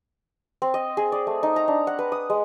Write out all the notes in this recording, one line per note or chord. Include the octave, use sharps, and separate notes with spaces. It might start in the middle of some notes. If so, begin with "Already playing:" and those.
C4
D#5
G#4
D5
A3
D#4
A#5
D4
F#5
B4
D#6
G#3